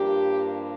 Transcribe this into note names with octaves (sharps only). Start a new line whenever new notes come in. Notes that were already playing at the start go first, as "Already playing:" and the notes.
Already playing: G2 F3 A#3 D4 G4